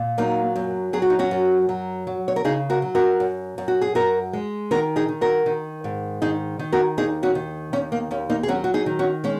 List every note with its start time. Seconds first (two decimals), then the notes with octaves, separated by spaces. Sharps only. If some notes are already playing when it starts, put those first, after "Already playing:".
Already playing: A#2
0.18 F#3 A#3 D#4
0.56 F#2
0.93 F#3 G#4
1.02 F#4
1.10 D#4
1.19 C#4 F#4
1.31 F#2
1.69 F#3
2.07 F#3
2.28 C#5
2.36 A#4
2.44 C#3 D#4 G#4
2.70 F#4 A#4
2.82 F#3
2.95 F#4 A#4
3.20 F#2
3.58 F#2
3.68 F#4
3.81 G#4
3.95 F#2 F#4 A#4
4.33 G#3
4.71 D#3 F#4 A#4
4.96 D#4 G#4
5.09 D#3
5.21 F#4 A#4
5.46 D#3
5.84 G#2
6.22 D#3 D#4 G#4
6.59 D#3
6.72 F#4 A#4
6.98 D#2 D#4 G#4
7.23 C#4 F#4
7.35 D#3
7.73 D#2 C#4
7.92 A#3
8.11 D#2 C#4
8.30 A#3 D#4
8.43 G#4
8.48 F#3 C#4 F#4
8.64 F#4
8.74 D#4 G#4
8.86 D#3
8.99 C#4 F#4
9.24 G#3 C#4